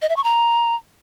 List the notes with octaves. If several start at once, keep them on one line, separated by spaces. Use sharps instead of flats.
D#5
E5
C#6
A#5